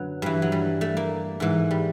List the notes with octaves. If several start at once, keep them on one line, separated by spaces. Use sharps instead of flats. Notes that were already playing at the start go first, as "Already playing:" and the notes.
Already playing: F#2 D3 F#3 B3
G2 E3
F#3
G3
A3
A#3
G#2 E3
G3